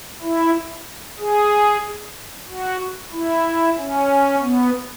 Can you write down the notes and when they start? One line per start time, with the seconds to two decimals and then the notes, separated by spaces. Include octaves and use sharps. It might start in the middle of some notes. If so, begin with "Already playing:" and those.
0.22 E4
1.19 G#4
2.48 F#4
3.12 E4
3.77 C#4
4.41 B3